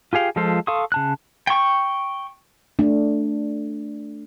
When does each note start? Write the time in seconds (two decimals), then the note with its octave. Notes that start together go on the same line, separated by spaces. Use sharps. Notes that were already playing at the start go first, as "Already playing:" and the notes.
0.13 F4 G4 G#4 F5 G5
0.36 F3 G#3 F4 A4 C5
0.67 A4 F5 C6 C#6 D#6
0.92 C#3 A5 F#6
1.47 G5 C#6
2.79 A3 D4